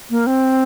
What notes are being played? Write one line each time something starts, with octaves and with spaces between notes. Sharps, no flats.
A#3
C4